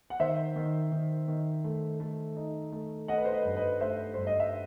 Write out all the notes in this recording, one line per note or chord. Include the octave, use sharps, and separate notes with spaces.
F#5
D#3 C5 E5
D#3
D#3
D#3
A3
A3
D#4
A3
A3 D#5 F#5
B4
C5
B4 D#5
G2
B4 D#5
A3 C5 E5
G2 C5
D#5
E5